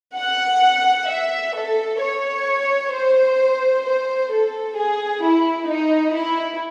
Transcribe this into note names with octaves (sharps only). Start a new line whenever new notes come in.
F#5
E5
A4
C#5
C5
C5
A4
G#4
E4
D#4
E4